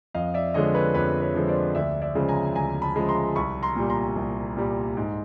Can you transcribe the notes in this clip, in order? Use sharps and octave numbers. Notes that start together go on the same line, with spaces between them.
F2 D#5 F5
D5 E5
D3 F3 G#3 C#5 D#5
B4 C#5
F2 B4 C#5
B4 C#5
D3 F3 G#3
C5 D5
D2 D5 E5
D5 E5
C#3 F3 G#3
G#5 A#5
D2 G#5 A#5
A5 B5
C#3 F3 G#3
A#5 C6
C2 B5 C#6
A#5 C6
A#2 G3
A#5 C6
C2
A#2 G3
G#2